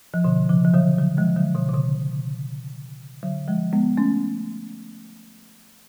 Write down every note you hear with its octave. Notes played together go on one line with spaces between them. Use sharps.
F3
B2 D3
C#3 F3
F3
D3 F#3
D3 F#3
F3 G#3
D3 F#3
B2 D3
C#3
B2 D3
D3 F#3
F3 G#3
G#3 B3
A3 C#4